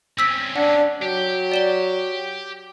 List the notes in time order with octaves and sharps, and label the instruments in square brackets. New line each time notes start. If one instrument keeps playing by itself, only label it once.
[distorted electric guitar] C4 C#4 [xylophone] E6 B6
[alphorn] D4 [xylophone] F#5
[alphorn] F#3 [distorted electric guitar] G4
[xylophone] D5 E7 G7